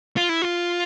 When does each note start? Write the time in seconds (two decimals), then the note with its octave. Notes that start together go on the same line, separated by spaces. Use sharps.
0.17 F4
0.29 E4
0.42 F4